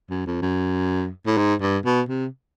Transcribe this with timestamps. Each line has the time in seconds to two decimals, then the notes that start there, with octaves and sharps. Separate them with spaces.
0.10 F#2
0.26 F2
0.42 F#2
1.26 A2
1.38 G#2
1.61 G2
1.85 B2
2.09 C3